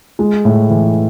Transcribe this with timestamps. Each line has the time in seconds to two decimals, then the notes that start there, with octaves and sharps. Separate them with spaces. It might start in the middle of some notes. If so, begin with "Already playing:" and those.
0.19 G#3
0.45 A2
0.70 E3